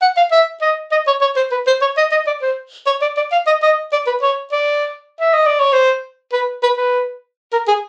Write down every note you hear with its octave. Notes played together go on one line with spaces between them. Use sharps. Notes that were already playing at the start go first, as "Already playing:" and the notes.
F#5
F5
E5
D#5
D#5
C#5
C#5
C5
B4
C5
C#5
D#5
D#5
D5
C5
C#5
D5
D5
F5
D#5
D#5
D5
B4
C#5
D5
E5
D#5
D5
C#5
C5
B4
B4
B4
A#4
G#4